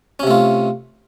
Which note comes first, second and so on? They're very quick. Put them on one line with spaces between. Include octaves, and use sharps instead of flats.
C#4 C3 A3 F4